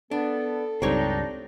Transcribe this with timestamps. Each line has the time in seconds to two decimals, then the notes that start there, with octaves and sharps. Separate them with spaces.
0.11 B3 D4 A4
0.82 C#2 G2 C#3 C4 D4 D#4 G4 C#5